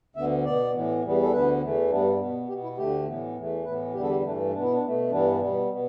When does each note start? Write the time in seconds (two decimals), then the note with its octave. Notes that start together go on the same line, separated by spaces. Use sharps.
0.16 D2 D3 B3 E5
0.45 B2 B3 D5
0.74 A2 E3 B3
1.03 E2 E3 G3 B3
1.23 A4
1.32 D2 D3 B3 B4
1.62 E2 E3 A3
1.90 G2 G3 B3 D4
2.20 B2 B3
2.49 B2 B3 G4
2.63 E4
2.77 D2 D3 A3 G4
3.07 A2 E3 B3
3.36 E2 E3 A3
3.65 A2 E3 B3 B4
3.94 E2 D3 G3 B3 G4
4.02 A4
4.10 G4
4.23 G2 E3 A3 D4
4.53 B2 B3 D4
4.62 E4
4.73 D4
4.82 B2 A3
5.10 G2 E3 G3 B3 D4
5.41 B2 G3 B3
5.69 B2 B3